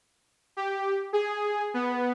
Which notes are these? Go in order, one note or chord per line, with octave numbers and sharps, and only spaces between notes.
G4
G#4
B3